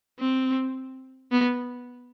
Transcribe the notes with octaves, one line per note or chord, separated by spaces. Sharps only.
C4
B3